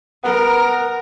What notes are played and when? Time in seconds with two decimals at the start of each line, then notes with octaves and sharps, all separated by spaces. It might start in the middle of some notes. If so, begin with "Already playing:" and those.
0.24 B3 A#4